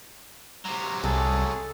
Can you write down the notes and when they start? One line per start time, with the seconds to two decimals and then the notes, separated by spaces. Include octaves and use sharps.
0.65 C3 F#3 A#5
1.04 C2 G#4 A4